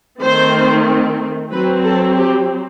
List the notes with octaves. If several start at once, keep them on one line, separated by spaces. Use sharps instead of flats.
D#3 A3 C4 C5
F#3 C4 B4
A4
G4